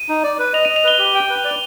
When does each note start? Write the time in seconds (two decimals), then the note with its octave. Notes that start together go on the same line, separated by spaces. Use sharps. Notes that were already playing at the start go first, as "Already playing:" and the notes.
Already playing: D#7
0.09 D#4
0.23 D5
0.39 B4
0.53 D#5 F7
0.65 D#5 D#7
0.76 F7
0.84 B4 G7
0.99 G4
1.14 G5
1.30 B4
1.45 D5